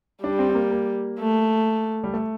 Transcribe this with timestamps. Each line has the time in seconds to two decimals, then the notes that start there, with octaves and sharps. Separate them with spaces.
0.24 G3 D4
0.39 C4
0.50 C4
0.55 A#3
0.71 A#3
1.19 A3
2.04 G3
2.14 A3